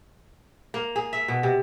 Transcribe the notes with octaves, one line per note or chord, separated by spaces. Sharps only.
A#3
G#4
E5
B2
C3